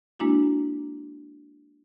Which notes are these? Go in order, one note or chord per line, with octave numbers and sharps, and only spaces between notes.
G#3 A#3 D4 E4 F#4